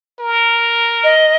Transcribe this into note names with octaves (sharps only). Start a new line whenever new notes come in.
A#4
D#5